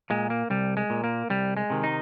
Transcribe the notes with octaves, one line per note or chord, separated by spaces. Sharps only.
A#2 G#3
A#3
C2 G3
G#3
A#2
A#3
C2 G3
G#3
C3 D#3
D#4